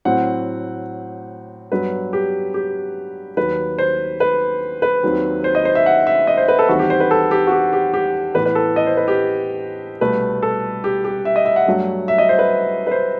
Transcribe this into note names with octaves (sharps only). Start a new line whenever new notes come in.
A2 F#3 C4 F#5
G2 F#3 B3 B4
G4
G4
D#2 D#3 F#3 B4
C5
B4
B4
D#2 D#3 F#3 C4
C5
D#5
C5
E5
F#5
E5
D#5
C5
B4
A4
E2 D#3 G3 C4 F#4
G4
C5
B4
A4
G4
F#4
G4
G4
G4
A2 E3 B3 B4
B4
A4
D#5
C5
B4
G4
C2 B2 A3 B4
A4
G4
G4
E5
D#5
E5
F#5
G2 F#3 A3
E5
D#5
C5
B4
B4
C5